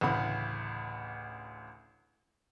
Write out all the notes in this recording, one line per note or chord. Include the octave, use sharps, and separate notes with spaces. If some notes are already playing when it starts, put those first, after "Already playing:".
A1 D2 C#3 B5